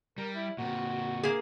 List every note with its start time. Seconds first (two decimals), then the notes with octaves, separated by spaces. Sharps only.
0.18 G3 A#4
0.35 E4
0.59 A#2 C4 F#4
1.23 A#3 G#4